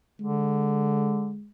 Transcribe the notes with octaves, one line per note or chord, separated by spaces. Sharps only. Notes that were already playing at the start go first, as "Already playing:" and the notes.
D3 G#3